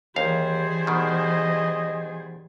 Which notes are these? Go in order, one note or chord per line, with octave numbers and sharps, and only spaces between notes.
D#2 E3 G3 G#4 C5 F5
B2 D#3 D#5